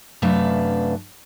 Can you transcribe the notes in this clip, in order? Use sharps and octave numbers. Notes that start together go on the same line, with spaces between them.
F#2 C3 A3 D4 B4 F5